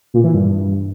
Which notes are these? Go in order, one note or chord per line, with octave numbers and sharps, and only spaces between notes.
A#2
E3
G2